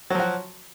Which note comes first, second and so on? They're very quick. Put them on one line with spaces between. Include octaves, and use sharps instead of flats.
F#3 F3 F#4